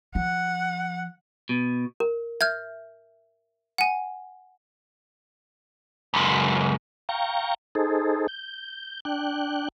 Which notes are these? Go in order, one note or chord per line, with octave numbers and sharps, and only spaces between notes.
F3 F#5
B2
A#4
E5 F6 G6 G#6
F#5 G#5
C#2 F#2
F5 G5 A#5 C#6
D#4 G#4 A4 C5
G6
D4 G5 F#6